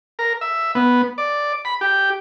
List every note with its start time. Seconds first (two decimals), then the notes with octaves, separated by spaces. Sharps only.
0.19 A#4
0.41 E5
0.75 B3
1.18 D5
1.65 B5
1.81 G4